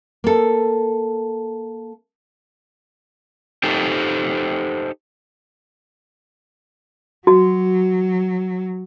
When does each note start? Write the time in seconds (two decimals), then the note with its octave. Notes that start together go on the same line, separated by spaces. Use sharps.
0.24 A#3 A4
3.63 D#4 G4 A4 C5
7.27 F#3 F#4